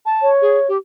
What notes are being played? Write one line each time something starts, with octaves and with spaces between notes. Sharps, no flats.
A5
C#5
G#4
G4